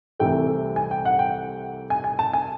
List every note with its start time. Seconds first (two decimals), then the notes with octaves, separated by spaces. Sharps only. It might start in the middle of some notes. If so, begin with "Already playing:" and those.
0.20 C2 C3 E3 A3 G5
0.76 G#5
0.91 G5
1.05 F#5
1.19 G5
1.90 G#5
2.04 G#5
2.19 A5
2.33 G#5